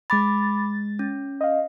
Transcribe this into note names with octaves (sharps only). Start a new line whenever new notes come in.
G#3 B5 D6 A6
C#4
D#5 F5